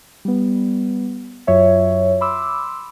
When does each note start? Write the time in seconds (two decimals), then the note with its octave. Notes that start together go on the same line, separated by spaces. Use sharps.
0.25 G3 B3
1.47 F#2 F#3 F4 C#5 E5
2.21 B5 C6 D6 E6